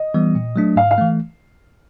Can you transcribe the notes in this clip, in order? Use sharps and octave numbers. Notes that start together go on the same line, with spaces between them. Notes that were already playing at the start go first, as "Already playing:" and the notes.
Already playing: D#5
E3 G3 B3
A#2
F#3 A3 D4
G#2 F5
F5
E3 A3